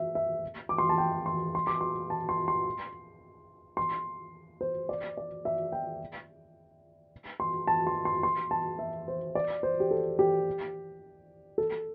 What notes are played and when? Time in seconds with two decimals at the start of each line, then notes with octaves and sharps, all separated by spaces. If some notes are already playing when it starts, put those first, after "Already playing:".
Already playing: E5
0.15 E5
0.69 D6
0.78 C6
0.89 A5
0.98 G5
1.26 C6
1.55 C6
1.67 D6
1.81 C6
2.10 A5
2.29 C6
2.48 C6
3.77 C6
4.61 C5
4.89 D5
5.17 D5
5.45 E5
5.72 G5
7.40 C6
7.67 A5
7.87 C6
8.05 C6
8.23 C6
8.51 A5
8.79 E5
9.08 C5
9.35 D5
9.63 C5
9.80 G4
9.91 A4
10.19 G4
11.58 A4